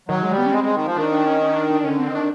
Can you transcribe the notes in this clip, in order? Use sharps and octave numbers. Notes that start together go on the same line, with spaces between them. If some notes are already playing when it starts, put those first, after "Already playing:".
D#3 F#3
G#3
G3
B3
C#4
G#3 C4
G#3
D#3
F3
D#3 D4
D4
C#4
C#4
D4
D4
D3 C#4
C4
D#3
D4